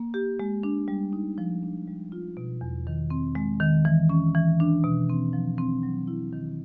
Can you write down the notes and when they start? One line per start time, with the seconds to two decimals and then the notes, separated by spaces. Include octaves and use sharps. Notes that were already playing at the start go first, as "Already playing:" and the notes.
Already playing: A#3
0.14 G4
0.40 G#3
0.63 D4
0.88 G3
1.13 D#4
1.38 F3
1.63 D4
1.87 G3
2.12 F4
2.37 B2
2.61 E2
2.87 D#3
3.10 C4
3.35 G#3
3.60 D#3
3.85 E3
4.09 C#4
4.35 E3
4.60 D4
4.84 B2
5.10 C4
5.33 F3
5.58 C4
5.83 F#3
6.07 E4
6.33 D#3